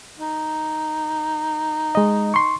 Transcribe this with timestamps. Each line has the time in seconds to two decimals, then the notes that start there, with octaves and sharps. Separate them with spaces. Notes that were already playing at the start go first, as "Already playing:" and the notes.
0.19 D#4
1.95 G#3 D#5
2.34 C6 C#6